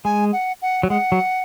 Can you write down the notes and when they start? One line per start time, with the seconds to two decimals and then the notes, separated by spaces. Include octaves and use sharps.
0.05 G#3 G#5
0.33 F#5
0.62 F#5
0.83 F#3
0.90 G#3 F#5
1.12 F#3